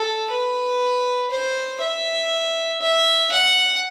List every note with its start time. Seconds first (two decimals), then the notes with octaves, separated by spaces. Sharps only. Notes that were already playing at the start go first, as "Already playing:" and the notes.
Already playing: A4
0.31 B4
1.31 C5
1.81 E5
2.81 E5
3.32 F#5